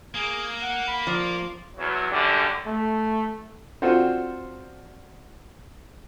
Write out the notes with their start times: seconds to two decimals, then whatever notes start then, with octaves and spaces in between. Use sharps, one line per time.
0.15 A#3 G#4
0.62 F#5
0.88 B5
1.07 F3 D5
1.77 E2 F#3
2.11 F#2 D3 G3
2.66 A3
3.82 C4 D4 F4 F#4 A4 C5